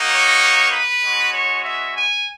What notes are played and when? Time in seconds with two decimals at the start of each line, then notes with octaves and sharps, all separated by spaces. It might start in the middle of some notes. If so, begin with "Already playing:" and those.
Already playing: A#3 D#4 F#4
0.09 C#5
0.71 B4
1.02 G#3 C#4 F#4
1.34 C#5
1.64 E5
1.96 G#5